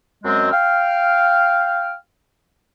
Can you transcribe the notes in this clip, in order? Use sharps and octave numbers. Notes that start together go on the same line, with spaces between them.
F#2 G#3 C4
F5 G5 F6